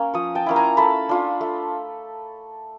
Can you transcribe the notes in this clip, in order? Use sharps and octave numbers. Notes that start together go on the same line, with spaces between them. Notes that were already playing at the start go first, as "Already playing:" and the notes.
Already playing: A#3 C#4
F3 C#6 D#6
G5 A5
A#3 C#4 E4
G#5 A#5
A3 A5 B5
D4 F4
A3